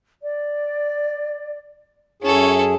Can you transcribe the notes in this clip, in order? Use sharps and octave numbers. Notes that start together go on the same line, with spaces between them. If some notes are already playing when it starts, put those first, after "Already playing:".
D5
F#2 C#4 E4 G#4 A4 C#6